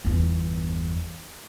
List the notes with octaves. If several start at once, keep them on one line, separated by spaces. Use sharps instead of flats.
G1 E2